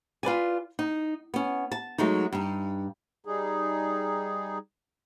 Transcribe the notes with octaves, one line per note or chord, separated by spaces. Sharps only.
F4 B4 D5 G#5
D#4
B3 C#4
A5
F#3 G#3 A3 D#4
G2 D#4
G3 D#4 G#4